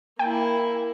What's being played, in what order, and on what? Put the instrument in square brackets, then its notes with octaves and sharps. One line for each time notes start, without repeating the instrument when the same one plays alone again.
[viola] A#3 E4 [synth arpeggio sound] G5